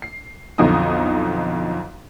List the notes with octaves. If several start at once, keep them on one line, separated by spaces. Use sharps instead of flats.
C7
B1 F2 D3 D#4 D#6